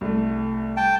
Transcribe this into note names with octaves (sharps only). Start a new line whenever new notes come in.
C2 A3
G5 A5